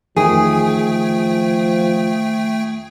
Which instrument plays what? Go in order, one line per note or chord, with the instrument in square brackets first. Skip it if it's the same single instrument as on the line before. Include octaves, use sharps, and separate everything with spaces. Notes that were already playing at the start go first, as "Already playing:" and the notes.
[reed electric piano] E2 D#3 [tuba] F3 [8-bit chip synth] A3 G5 [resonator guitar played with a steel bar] G#4